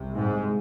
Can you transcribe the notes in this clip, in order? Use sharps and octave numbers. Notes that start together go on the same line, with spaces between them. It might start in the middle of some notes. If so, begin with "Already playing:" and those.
Already playing: C2 C3
G#2 G#3